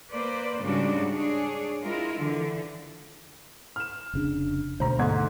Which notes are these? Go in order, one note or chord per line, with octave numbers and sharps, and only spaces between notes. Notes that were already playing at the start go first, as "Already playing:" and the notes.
A#3 B4 C5 D5
G#2 C#3 G3 G#3 D4 F#4
D4 G#4 C#5
G#3 E4 F4 A#4
D3 E3
F6 E7
F1 C#3 D4
D2 B2 A3 C5 A#5
G#2 D3 G#6